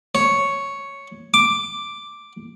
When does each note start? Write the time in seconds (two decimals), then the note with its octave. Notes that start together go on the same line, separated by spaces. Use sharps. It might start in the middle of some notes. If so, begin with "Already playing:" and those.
0.15 C#5
1.34 D6